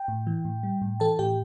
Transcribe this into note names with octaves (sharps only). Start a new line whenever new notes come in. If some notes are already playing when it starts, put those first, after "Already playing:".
Already playing: G5
A2
E3
A2
G3
A2
E3 A4 A5
A2 G4 G5